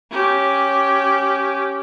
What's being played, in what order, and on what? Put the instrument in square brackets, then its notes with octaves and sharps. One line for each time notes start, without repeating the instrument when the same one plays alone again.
[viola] C#4 G4